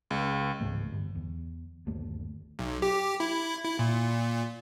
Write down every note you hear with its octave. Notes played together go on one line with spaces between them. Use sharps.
C#2
C#2 G#2 E3 A3
G1
E2
G1 D#2 A3
B1
G4
E4
E4
A#2